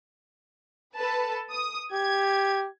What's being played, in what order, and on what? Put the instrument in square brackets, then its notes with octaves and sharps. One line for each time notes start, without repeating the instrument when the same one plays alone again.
[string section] A4 B4 A5
D#6
[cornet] G4 [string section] G#6